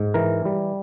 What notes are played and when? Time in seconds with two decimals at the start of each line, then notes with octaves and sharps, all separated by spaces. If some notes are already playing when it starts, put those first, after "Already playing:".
Already playing: G#2
0.14 E3 A#4
0.45 G3